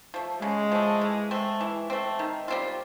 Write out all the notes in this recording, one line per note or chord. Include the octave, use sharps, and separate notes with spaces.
F3 A3
C#3 G#3
F3 A3
E3
A3 C4
E3
A3 C4
D#3
G3 C4 F4